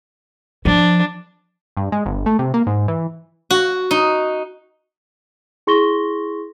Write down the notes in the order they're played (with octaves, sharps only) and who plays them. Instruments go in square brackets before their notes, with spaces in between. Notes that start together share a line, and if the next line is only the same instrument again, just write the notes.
[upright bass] F3 [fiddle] D4
[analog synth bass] G2
G#3
G1
A3
C3
A#3
G#2
E3
[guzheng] F#4
D#4
[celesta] E4 G#4 C6 C#6 A#6 G7